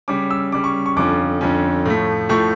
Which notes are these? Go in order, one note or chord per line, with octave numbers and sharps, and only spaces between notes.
C#3 G3 C#4 D6
E6
C#3 G3 C#4 D6
C#6
C#6
F2 D3 F3 C#4 D6
F2 D3 F3 C#4
A2 F3 A3
A2 F3 A3 C#6